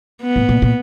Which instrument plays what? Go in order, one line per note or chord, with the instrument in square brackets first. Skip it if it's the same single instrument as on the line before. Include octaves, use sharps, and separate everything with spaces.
[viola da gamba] B3
[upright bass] A2
A#2
A#2